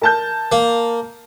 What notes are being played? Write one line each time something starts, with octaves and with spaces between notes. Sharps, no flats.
A#4 A5 G6
A#3